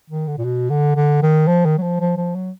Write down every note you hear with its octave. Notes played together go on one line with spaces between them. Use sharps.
D#3
D3
A#2
B2
D3
D3
D#3
F3
D#3
F#3
F3
F3
F3
F#3